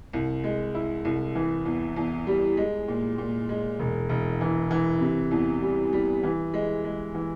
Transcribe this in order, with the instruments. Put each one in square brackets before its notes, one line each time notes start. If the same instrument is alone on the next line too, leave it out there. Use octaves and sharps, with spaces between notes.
[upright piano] C2
G#3
E4
C2
E3
E2
E2
G3
G#3
A#2
A#2
G#3
E1
E1
E3
E3
C3
E2
G3
G3
E3
G#3
G#3
E3